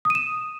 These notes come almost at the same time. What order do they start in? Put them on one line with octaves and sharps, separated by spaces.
D#6 D#7 E7